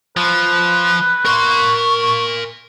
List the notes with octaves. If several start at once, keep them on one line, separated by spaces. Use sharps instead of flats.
F3 B4
A#4 C6 C#6